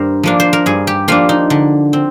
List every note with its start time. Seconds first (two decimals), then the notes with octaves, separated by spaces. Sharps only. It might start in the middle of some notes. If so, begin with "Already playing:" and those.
Already playing: G2 A#4 C5
0.23 F3 A#3 D4
0.40 C5
0.53 A#4
0.66 G2 G#4
0.87 G4
1.08 F3 A#3 D4 F4
1.29 D#4
1.50 D3
1.93 C4